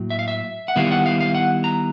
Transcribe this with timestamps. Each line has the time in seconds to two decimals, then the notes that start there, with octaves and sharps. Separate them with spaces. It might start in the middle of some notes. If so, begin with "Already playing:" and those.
Already playing: A2 F#3 A#3
0.10 E5
0.19 F5
0.28 E5
0.68 F#5
0.76 D#3 G3 B3 E4 F5
0.91 F#5
1.06 F5
1.21 F5
1.35 F#5
1.64 A#5